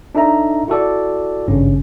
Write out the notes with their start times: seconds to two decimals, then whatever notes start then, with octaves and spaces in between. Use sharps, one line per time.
0.15 D4 D#4 A4 E5 A#5
0.68 E4 F#4 A4 D5
1.48 G#1 G2 C#3 C#4